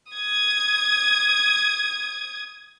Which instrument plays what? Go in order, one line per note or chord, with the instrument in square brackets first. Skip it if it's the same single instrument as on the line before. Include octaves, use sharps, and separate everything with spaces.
[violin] D#6 G#6